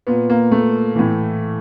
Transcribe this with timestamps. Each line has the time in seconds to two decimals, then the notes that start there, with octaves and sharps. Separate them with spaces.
0.07 A#2 B3
0.30 A#3
0.52 A3
0.95 A2 E3